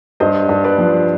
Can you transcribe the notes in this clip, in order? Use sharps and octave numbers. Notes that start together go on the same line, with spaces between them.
G2 C5 D#5
G2
B4 D5
F3